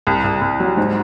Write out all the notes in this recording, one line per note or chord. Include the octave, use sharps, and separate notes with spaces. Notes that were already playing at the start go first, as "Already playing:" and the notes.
C2
C2
C2
F#3
G#2